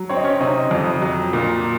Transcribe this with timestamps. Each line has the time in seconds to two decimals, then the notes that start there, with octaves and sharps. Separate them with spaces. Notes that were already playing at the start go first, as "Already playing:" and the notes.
Already playing: F#3
0.09 C4 C#5
0.17 D#5
0.24 C#4 C#5
0.40 C3 D#4 D#5
0.71 F2
1.02 F#3
1.33 A#2